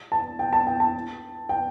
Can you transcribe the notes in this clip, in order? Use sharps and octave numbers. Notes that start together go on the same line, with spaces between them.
A5
G5
A5
G5
A5
G5